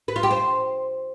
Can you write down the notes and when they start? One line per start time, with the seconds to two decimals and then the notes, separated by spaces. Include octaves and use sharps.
0.08 B4
0.16 F4
0.23 G4
0.31 C5